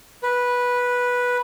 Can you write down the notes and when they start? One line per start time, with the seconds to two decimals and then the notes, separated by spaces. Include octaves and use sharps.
0.23 B4